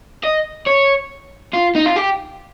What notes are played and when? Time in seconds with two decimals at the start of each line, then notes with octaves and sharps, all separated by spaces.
0.24 D#5
0.67 C#5
1.53 F4
1.75 D#4
1.85 F4
1.96 G4